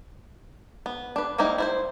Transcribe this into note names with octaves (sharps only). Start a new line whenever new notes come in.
B3
D4 B4
G3 A#3 C4 D#4 E4
E4 F4 C5